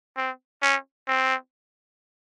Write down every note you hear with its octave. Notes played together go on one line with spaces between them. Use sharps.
C4
C#4
C4